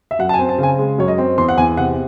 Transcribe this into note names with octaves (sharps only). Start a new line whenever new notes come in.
E5
F#2 F#5
A5
G#5
C4
A5
C#3 G#5
G#3
F#2 C#5
D#5
C4
E2 C6
F#5
E2 G#5
C3 F#5